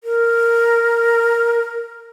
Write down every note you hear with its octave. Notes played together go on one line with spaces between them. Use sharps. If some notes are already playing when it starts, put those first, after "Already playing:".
A#4